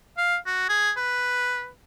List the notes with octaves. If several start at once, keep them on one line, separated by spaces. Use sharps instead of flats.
F5
F#4
G#4
B4